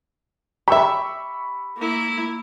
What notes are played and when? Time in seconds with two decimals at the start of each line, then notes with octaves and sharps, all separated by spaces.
0.68 G4 E5 B5 C#6 E6
1.77 A#3 E4